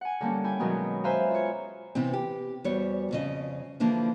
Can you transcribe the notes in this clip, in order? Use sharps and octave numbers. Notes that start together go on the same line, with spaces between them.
F#5 G#5
D3 G3 A#3 C#4
E4 G5 G#5
B2 D#3 F#3 G#3 B3
B4 C5 E5 F5 G#5 A#5
F4 C#5
C3 E3 B3 C4
G4
E2 G3 F#4 C5 C#5
F2 C#3 D#5
D3 E3 F3 A#3